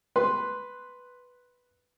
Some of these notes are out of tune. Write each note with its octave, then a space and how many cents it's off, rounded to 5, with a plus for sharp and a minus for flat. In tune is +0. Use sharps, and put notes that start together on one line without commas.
B4 +0 C6 +0